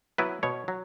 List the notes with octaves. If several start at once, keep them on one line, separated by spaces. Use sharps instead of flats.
F#3 B3 E4 B4
B2 C#5
F#3